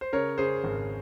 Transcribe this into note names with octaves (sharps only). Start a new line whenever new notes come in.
C5
C#3 A#4 C#5
C#3 G#4 C5
G#1